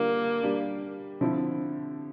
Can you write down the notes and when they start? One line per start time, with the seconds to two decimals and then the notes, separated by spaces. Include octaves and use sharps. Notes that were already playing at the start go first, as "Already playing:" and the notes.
Already playing: D3 G3 A#3 D4 F4
0.43 G3 D4 G4
1.21 D3 F3 C4 E4